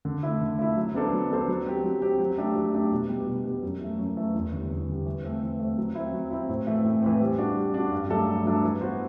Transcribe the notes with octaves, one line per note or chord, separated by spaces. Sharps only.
D3
A3 E4
D3
A3 E4
F#3
B3 D4 A4 C5
F#3
B3 D4 A4 C5
F#3
C4 G4
F#3
C4 G4
F#3
A3 D4 G4
F#3
A3 D4 G4
B2
G3 B3
B2
G3 B3
F#2
E3 A3
F#2
E3 A3
E2
D3 G3
E2
D3 G3
E3
A3 C4
E3
A3 C4
F#3
C4 E4
F#3
C4 E4
A2
E3 A3 C4
A2
E3 A3 C4
G3
D4 F#4
G3
D4 F#4
G2
F#3 A3 D4 A4
G2
F#3 A3 D4 A4
E3
B3 F#4 C5